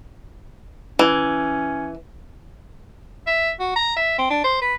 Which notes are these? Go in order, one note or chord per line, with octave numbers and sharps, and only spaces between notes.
E3 C#4
E5
F#4
A#5
E5
C4
D4
C5
B4